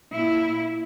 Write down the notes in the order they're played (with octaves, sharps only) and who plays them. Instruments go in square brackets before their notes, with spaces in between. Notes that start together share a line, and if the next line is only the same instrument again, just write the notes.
[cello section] A#2 E4